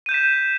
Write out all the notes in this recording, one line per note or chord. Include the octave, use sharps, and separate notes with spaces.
G6 B6 D#7 E7